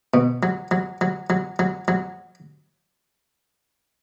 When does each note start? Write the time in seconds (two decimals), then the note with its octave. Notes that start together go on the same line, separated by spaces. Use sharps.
0.14 B2
0.43 F#3
0.71 F#3
1.01 F#3
1.30 F#3
1.59 F#3
1.88 F#3